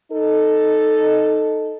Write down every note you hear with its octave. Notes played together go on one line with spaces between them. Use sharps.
D#4 A4